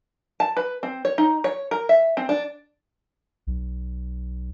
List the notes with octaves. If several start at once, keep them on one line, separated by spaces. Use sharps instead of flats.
A5
B4
C4
C#5
D#4
C#5
A#4
E5
C4
D4
B1